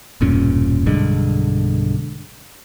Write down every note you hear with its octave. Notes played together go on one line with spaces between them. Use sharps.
E1 G2 A#2 C#4
B1 G2 D3 G#3